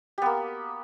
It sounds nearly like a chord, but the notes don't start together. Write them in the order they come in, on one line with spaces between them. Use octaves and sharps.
G4 B3 A#3